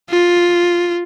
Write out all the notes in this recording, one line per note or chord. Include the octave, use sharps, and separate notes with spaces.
F4